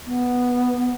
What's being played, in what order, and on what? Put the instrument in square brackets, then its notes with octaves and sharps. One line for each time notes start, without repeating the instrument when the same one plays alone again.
[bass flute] B3